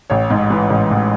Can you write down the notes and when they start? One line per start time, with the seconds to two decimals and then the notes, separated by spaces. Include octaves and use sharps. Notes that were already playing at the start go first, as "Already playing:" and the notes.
0.10 A1 C#5
0.30 G#2
0.50 E3
0.70 A1
0.91 A1